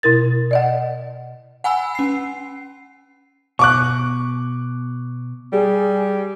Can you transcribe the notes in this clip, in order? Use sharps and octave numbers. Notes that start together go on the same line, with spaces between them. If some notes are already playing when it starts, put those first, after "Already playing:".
B2 E4 A#4 A6
D5 D#5 F#5
F#5 G#5 B5 E6
C#4 C7
B2 C#6 D6 F#6
G3 G#4